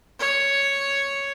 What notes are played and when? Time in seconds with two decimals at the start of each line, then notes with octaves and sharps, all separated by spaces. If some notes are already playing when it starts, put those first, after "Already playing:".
0.19 C#5